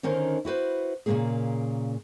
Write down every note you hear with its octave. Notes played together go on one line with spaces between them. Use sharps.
D3 D#3 C#4 D#4 A#4 C5
E4 F#4 B4 C5
A#2 C#3 F3 A3 A#3 G#4